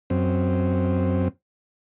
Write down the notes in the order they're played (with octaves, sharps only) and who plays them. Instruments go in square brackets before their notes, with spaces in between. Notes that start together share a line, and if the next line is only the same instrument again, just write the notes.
[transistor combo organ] F#2 C4